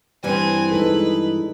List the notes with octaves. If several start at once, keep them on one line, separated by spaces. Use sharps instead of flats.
G2 E3 G3 C4 G#5
G#3 D#4 A4 B4